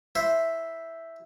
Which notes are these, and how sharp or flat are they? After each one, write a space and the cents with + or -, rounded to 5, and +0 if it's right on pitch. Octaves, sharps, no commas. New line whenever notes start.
E4 +0 C5 +0